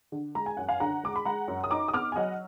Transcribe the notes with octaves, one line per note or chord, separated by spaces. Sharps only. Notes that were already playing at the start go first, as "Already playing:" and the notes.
D3
G#3 A#5
G#5
F#2 F#5
F5 G#5
D3 F#5 A#5
G#3 D6
B5
G#3 F#5 A#5
F#2
D#6
D#4 A#5 D6
D#6
B3 D6 F6
G#5
F#3 D#5 F#5